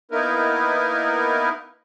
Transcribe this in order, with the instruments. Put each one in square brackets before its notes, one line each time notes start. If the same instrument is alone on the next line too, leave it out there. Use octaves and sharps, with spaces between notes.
[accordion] A#3 B3 D#4 E4 A#4 B4